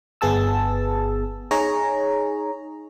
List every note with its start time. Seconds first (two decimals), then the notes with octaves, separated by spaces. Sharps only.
0.21 G1 B3 G#4 A5 E6
1.51 D#4 G#4 C#5 A#5